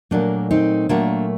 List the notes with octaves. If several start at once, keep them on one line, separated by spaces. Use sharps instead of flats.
A#2 F#3 A3 A#3 D4
C4 D#4
A#2 F#3 A3 A#3 D4